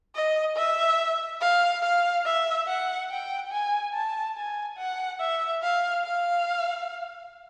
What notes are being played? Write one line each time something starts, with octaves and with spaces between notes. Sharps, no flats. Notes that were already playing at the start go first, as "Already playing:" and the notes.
D#5
E5
F5
F5
E5
F#5
G5
G#5
A5
G#5
F#5
E5
F5
F5